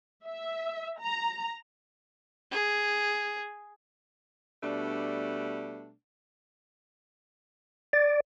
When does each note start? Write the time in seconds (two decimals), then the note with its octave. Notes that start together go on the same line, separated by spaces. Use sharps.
0.25 E5
0.99 A#5
2.51 G#4
4.63 B2 G3 A3 D4
7.93 D5